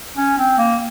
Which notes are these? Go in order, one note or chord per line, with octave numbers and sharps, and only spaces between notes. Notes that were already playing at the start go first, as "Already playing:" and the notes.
C#4
C4
A#3